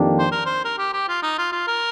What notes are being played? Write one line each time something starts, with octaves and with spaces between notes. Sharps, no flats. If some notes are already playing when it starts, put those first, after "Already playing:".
Already playing: F2 D#3 A#3 D4 G4
C5
A#4
C5
A#4
G4
G4
F4
D#4
F4
F4
A#4